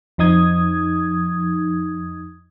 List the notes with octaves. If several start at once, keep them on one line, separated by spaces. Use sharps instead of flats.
F2 F3 D#4 D#6 G#6